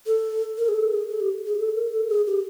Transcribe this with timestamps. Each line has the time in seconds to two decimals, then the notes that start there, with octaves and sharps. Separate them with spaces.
0.07 A4
0.58 A#4
0.68 G#4
0.74 A4
0.91 G#4
1.09 A4
1.20 G4
1.46 G#4
1.59 A4
1.75 A#4
1.92 A4
2.09 G#4
2.27 G4